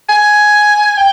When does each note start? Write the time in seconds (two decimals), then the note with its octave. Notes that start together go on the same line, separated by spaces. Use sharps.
0.09 G#5
0.97 G5